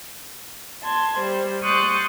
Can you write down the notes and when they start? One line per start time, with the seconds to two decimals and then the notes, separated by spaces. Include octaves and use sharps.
0.83 A5 C6 G#6
1.18 G3 C5
1.64 C6 C#6 D#6 F#6 G6 A6